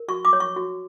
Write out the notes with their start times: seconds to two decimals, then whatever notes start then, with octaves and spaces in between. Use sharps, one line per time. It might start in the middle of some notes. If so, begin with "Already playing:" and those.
Already playing: A#4
0.08 F#4 C#6
0.25 D6
0.33 C#5
0.40 C#6
0.56 F#4